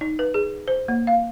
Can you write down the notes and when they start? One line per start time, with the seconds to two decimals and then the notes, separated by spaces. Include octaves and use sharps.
0.01 D#4
0.19 B4
0.34 G#4
0.68 C5
0.88 A#3
1.07 F5